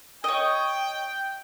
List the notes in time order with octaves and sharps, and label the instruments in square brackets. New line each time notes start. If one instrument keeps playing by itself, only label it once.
[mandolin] C#5 D#5 [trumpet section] G5